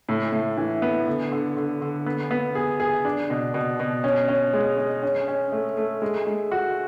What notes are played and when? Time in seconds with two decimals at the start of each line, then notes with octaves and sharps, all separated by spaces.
0.09 A2
0.32 A2
0.57 E3
0.82 B3
1.07 D3
1.32 D3
1.57 D3
1.81 D3
2.06 B3
2.31 B3
2.55 G#4
2.80 G#4
3.05 D4
3.30 B2
3.54 B2
3.80 B2
4.04 C#4
4.28 C#4
4.53 G#3
4.78 G#3
5.03 C#4
5.28 C#4
5.52 A3
5.77 A3
6.02 G#3
6.27 G#3
6.52 F#4